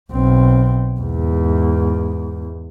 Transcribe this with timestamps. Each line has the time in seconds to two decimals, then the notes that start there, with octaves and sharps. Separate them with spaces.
0.12 B1 C4
1.00 E2 G#2